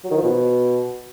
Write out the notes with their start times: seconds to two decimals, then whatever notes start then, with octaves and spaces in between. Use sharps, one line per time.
0.04 F#3
0.11 D#3
0.17 F3
0.24 B2